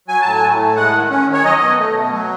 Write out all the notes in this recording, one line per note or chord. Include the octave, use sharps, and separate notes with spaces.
F#3 G#5
A2 A5
G#5
A3
A2
G#3 F#5
D#3
C#4
D#3
C#5
F#3 D#5
B2
A3
B2
F#3